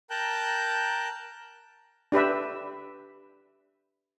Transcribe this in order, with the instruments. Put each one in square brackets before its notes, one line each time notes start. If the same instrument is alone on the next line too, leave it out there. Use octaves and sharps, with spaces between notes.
[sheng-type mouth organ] A#4 G5 A5 A#5 F#6 G6
[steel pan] D4 G4 B4 E5